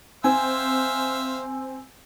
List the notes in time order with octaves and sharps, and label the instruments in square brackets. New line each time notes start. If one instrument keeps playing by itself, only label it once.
[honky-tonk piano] C4 [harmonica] C5 E5 F5 [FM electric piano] G#5 E6